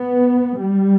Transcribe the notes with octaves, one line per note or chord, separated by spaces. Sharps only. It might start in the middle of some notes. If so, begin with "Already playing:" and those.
Already playing: B3
G3